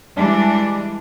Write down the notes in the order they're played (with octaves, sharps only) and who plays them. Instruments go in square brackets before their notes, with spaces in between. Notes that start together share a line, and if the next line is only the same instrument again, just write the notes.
[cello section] E3 G3 G#3 D4